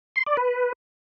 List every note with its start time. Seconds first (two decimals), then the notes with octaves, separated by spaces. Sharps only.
0.16 C6
0.27 D5
0.37 B4